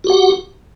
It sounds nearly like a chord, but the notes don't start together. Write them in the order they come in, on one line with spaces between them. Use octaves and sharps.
F#4 G4 F#5